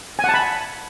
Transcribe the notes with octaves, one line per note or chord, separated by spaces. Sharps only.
F#5 G#5 A5 B5